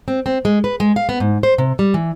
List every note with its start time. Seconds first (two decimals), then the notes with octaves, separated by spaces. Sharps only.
0.08 C4
0.26 C4
0.45 G#3
0.64 B4
0.80 G#3
0.96 F5
1.09 B3
1.20 G#2
1.43 C5
1.58 C3
1.79 G3
1.94 E3